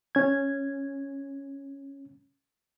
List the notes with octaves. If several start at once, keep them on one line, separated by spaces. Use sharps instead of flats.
C#4 G#6